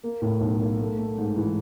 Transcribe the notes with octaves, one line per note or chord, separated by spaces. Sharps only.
A#3
A2
B1
A#3
A3
A3
G#2
E3